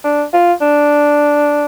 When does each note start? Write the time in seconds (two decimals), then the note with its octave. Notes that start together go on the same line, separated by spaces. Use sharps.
0.04 D4
0.33 F4
0.61 D4